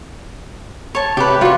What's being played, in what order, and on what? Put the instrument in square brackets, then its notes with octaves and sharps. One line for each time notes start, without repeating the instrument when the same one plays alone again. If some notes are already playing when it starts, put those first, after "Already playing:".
[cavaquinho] C#5 A5
[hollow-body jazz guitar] C3 [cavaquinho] G4 B4
[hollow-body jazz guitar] G3 F#4 A#5 [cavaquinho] F4 C#6